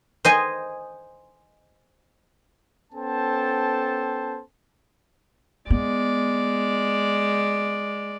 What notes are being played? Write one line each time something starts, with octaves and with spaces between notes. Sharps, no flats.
C5 D#5 G#5
B3 C#4 A4 C5 G5 A5
G#3 B3 D5